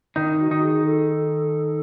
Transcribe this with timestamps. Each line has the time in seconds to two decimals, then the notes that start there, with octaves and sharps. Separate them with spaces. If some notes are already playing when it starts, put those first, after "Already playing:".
0.16 D#3 D#4
0.40 F#4
0.51 D#3 D#4
0.62 G#4
0.85 A4